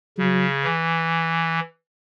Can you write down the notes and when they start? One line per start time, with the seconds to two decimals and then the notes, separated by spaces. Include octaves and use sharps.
0.18 C#3 F#3
0.64 E3